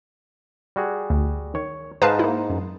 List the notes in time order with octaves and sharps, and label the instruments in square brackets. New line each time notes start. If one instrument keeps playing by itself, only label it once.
[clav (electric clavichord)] G3 F#4 G#4
[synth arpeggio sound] D2
[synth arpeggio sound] D#3 [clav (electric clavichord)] C#5
[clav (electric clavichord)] G#2 D#4 C5 [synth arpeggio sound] B4 F5 A5
[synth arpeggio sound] A#3 E4
F#2